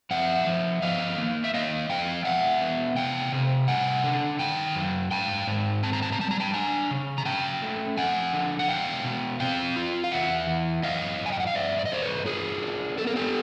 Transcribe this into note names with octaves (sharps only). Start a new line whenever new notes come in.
F3 E5 F#5
F3
F3 D#5 F5
A#3
E5
A#3 D#5 F5
F3 F5 G5
B2 E5 F#5
B3
C3 F5 G5
C3
G3 F#5 G#5
D3
D#3 G5 A5
F#2
G#2 G5 A5
G#2
C4 A5
A#5
A5
A#5
G3 A5
A#5
G5 A5
D4 G#5 A#5
C#3
A#5
C#4 G5 A5
A3
F3 F#5 G#5
D3
F#5
B2 F5 G5
B2
C4 F5 G5
F4
F5
E2 E5 F#5
E3
F#2 D#5 F5
F#2
G#5
G5
F#5
F5
G2 D5 E5
D5
D#5
G2 C5 D5
B4 C#5
F4 G#4 A#4
D4
B3 A4
A#4
G4 A4